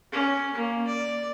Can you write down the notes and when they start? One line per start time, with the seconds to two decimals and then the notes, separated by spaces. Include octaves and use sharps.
0.12 C#4
0.54 A#3
0.87 D5